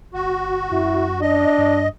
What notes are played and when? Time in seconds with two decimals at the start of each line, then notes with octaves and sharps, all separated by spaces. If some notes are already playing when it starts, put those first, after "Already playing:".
0.14 G1 F#4
0.71 F#2 E4
1.21 D4 D#5
1.58 G2